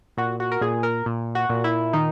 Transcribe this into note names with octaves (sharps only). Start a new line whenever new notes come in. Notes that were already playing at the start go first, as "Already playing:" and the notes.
A#2 F#4
F#4
A#4
A#2 G#4
A#4
A#2
F#4
A#2
E4
D#3 D#4